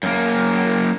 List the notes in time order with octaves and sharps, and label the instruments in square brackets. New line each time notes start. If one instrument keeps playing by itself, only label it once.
[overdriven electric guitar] F#2 A#3